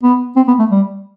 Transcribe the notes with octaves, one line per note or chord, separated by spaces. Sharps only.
B3
C4
B3
A3
G3